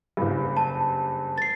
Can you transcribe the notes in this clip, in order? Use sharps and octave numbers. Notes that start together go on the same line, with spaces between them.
F#1 G2
A5
A6 C7